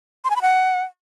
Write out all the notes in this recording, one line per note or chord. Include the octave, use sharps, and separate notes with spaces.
C6
G#5
B5
F#5